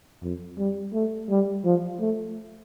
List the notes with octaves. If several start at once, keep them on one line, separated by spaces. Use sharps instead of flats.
F2
G3
A3
G3
F3
A3